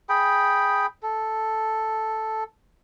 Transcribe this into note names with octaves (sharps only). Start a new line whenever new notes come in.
G#4 G5 B5
A4